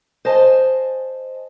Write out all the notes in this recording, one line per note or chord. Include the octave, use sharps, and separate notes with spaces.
C5 D#5 G#5 A5